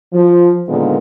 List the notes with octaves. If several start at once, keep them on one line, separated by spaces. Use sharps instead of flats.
F3
A#2 D3 D#3 F3 G#3 B3